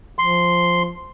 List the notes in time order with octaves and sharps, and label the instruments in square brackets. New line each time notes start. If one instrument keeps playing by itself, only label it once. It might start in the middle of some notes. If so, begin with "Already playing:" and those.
[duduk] F3 [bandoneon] C6